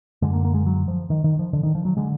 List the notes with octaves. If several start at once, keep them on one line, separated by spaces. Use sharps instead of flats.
F#2 D3 G#3
A#3
A#3
G#3
F#3
F3
D#3
D#3
F3
D3
D#3
F3
F#3
D3 G#3